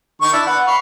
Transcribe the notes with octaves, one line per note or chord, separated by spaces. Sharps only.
D#3 C#6
D4 E4
B4 F#5
F5 B5 C#6